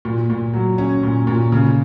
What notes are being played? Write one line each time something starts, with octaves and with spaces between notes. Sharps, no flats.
A#2
A#2
F#3
C#4
A#2
A#2
C#3